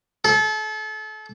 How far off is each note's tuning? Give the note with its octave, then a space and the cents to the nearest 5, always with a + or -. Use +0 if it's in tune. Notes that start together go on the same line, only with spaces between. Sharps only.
A4 -35